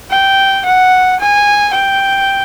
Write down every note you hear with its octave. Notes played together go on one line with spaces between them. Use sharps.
G5
F#5
G#5
G5